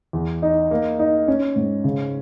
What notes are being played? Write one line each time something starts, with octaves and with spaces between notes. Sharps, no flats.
E2
D#4
A#3
D#4
C#4
G#2
C#3